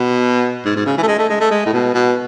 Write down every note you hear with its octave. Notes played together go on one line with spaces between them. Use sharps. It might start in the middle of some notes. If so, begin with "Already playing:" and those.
Already playing: B2
G#2
G#2
C#3
E3
A3
G#3
A3
G#3
A3
G#3
A2
B2
B2